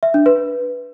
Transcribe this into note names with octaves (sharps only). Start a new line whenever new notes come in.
E5
D4
B4